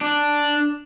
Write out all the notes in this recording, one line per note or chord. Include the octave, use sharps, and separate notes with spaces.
D4